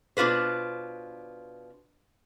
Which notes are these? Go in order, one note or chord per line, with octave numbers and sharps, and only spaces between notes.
B2 D4 F4 B4 C5